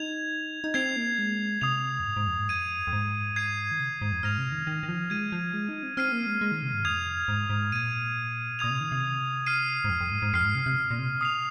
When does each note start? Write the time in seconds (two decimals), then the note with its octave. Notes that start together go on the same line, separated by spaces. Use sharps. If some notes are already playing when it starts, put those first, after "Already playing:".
Already playing: D#4 G#6 F7
0.64 D#4
0.74 C4 G#6 C7 F7
0.96 A#3
1.18 G#3
1.61 C3 D#6 C7 F7
2.00 F2
2.05 G#2
2.16 G#2
2.27 F2
2.38 G#2
2.49 F2 G#6 D#7
2.87 F2
2.93 G#2
3.36 G#6 C7 D#7
3.71 D#3
3.80 C3
4.02 G#2
4.12 F2
4.23 G#2 F6 A#6 F7
4.38 C3
4.52 D#3
4.67 D#3
4.83 D#3
4.89 F3
5.10 G#3 G#6 D#7
5.32 F3
5.54 G#3
5.69 D#4
5.83 C4
5.97 C4 F6 C7 D#7
6.12 A#3
6.27 G#3
6.41 G#3
6.52 D#3
6.63 C3
6.74 G#2
6.85 F2 D#6 G#6 C7 F7
7.28 G#2
7.50 G#2
7.72 A#2 G#6 D#7
8.59 A#2 D#6 G#6 F7
8.70 C3
8.81 D#3
8.92 C3
9.46 F6 C7 D#7
9.84 G#2
9.90 F2
10.01 F2
10.12 G#2
10.22 G#2
10.33 F2 F6 C7 D#7
10.45 G#2
10.55 C3
10.66 C3
10.91 A#2
10.99 C3
11.21 D#6 C7 F7